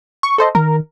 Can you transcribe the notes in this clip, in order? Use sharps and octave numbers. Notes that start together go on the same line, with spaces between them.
C#6
A4 C5 D#5
D#3 A#4